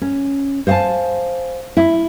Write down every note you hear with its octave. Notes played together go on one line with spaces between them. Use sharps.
C#4
C5 F5 F#5 G#5 A5
E4